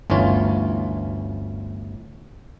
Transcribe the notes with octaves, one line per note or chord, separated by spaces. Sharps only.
G1 D2 E3 C#4 F4